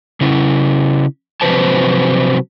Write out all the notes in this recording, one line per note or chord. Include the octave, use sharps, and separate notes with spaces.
C#3 C#4 E4
C3 F3 F#3 B4 C5 A5